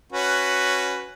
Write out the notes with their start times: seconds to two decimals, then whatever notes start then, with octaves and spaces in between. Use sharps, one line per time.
0.12 C#4 F#4 B4